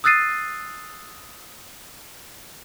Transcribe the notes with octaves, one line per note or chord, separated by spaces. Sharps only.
D#6 E6 F#6 A6 C7 D#7